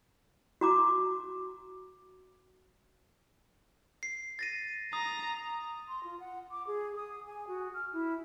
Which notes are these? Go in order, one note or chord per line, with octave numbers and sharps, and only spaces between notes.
F#4 A#5 D6
C7
A6 A#6 D#7
A#5 D#6
C6
F4
F#5
D6
G#4
D#6
G#5
F#4
F6
E4